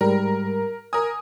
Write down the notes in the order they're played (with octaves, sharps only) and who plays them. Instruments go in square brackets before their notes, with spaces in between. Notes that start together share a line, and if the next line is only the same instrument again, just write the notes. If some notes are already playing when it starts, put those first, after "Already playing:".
[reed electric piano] G#2 G3 [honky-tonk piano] A#4
[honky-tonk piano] A#4 D#6 [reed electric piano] G#5